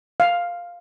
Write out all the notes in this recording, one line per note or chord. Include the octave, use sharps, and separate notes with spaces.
F5